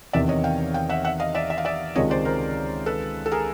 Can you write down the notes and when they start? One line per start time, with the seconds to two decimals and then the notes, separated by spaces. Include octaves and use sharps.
0.13 E2 C3 D#3 D5 E5
0.29 C#5 D#5
0.44 F5 G5
0.74 F5 G5
0.89 E5 F#5
1.05 E5 F#5
1.20 D#5 F5
1.35 D5 E5
1.50 E5
1.58 F5
1.65 D5 E5
1.96 C#2 C3 D#3 G#3 C#5 D#5
2.11 C5 D5
2.25 A#4 C5
2.86 A4 B4
3.26 A4
3.32 G#4 A#4